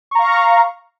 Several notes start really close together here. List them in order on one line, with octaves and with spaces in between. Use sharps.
C#6 A#5 F5